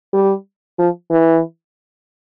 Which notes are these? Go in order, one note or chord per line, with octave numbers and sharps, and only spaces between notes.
G3
F3
E3